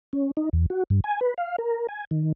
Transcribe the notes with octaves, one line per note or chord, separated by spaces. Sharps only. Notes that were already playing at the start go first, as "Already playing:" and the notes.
C#4
D#4
E2
F#4
G2
G#5
B4
F5
A#4
G#5
D#3